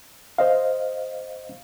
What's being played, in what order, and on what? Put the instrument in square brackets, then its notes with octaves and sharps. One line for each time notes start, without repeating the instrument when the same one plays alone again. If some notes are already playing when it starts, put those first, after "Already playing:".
[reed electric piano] C5 D#5 F5